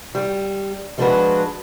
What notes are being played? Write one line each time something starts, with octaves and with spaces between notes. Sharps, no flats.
G3
F3 G#3 D4 D#4 F#4 B4